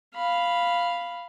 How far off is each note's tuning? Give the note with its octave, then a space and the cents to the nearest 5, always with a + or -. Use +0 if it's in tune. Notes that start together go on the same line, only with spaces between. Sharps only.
F5 -5 B5 +0